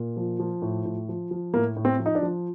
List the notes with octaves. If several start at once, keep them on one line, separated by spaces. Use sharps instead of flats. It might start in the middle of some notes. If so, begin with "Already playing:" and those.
Already playing: A#2
F3
F3
A2
A2
F3
F3
A2 A#3
A2
C4
F3
D#4
D4
F3